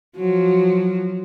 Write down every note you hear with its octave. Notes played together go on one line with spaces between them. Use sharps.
F3 F#3